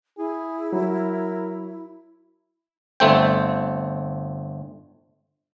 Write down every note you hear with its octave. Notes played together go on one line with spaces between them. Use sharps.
E4 G#4
F#3 A#4
G1 A3 C4 G5